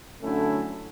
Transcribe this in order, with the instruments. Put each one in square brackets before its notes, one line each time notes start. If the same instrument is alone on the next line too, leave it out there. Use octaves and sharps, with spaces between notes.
[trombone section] D3 F#3 A3 C#4 E4